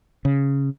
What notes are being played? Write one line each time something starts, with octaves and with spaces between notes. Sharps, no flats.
C#3